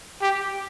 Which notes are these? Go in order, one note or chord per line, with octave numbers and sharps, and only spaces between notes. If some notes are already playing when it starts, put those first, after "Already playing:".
G4